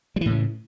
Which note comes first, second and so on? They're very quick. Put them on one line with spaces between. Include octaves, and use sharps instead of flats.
G3 E3 A2 C#3